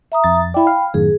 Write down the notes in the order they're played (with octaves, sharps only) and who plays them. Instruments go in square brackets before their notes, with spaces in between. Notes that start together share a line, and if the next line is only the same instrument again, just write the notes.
[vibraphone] E5 A#5 D#6
[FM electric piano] F2 A6
[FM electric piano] E4 D5 [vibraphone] G5 B5
[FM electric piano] F5
[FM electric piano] F#2 A2 D#3 [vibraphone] G#4